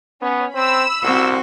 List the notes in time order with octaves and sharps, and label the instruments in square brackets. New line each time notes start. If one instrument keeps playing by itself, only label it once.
[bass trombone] B3 [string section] C#4
[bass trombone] C4 [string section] B5 E6
[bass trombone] C2 [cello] C4 F#4